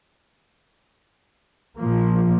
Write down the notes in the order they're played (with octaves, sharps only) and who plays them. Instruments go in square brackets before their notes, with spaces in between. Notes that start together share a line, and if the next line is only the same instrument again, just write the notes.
[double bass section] A#2 F3 A#3